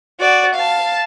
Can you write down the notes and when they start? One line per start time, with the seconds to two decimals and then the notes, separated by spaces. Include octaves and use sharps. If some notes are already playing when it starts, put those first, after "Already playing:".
0.20 F#4 D5
0.55 F5 A5